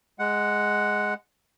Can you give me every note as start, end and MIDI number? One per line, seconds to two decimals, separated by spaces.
0.19 1.14 56
0.19 1.14 78